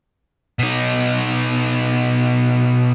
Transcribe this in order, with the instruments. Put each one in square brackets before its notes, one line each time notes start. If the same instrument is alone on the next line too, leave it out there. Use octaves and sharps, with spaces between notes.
[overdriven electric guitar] B2 D#4